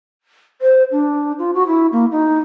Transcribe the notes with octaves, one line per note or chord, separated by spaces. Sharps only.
C5
D4
F4
F#4
E4
A#3
D#4